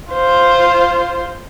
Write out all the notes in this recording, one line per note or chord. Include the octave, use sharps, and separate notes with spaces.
F4 C5